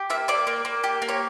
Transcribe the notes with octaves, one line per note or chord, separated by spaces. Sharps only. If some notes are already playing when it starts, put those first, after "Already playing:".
Already playing: G4
A#3 E5
A#3 D5
A#3
A#3
G4
A#3
C#5